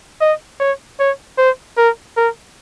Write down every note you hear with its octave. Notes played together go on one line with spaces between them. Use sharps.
D#5
C#5
C#5
C5
A#4
A#4